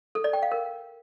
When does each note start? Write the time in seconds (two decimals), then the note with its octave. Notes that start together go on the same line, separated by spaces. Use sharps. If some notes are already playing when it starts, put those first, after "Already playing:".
0.15 A4
0.24 D5
0.33 G5
0.42 F5
0.52 A#4